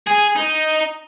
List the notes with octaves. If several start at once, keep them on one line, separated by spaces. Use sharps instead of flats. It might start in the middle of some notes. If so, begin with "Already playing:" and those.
G#4
D#4